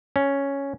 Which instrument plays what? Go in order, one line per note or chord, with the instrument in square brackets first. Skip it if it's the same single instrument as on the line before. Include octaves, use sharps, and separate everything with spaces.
[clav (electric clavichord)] C#4